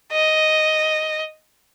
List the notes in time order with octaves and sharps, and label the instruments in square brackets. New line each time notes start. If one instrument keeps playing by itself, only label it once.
[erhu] D#5